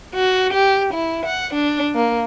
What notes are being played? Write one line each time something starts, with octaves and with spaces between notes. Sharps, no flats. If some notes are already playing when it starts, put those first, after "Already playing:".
F#4
G4
E4
F#5
D4
A#3